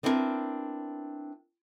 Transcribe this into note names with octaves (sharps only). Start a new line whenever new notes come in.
B3 C4 D4 E4 F4 A#4